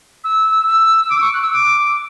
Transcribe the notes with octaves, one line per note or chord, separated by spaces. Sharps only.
E6
E6
D6
C#6
F#6
E6
D6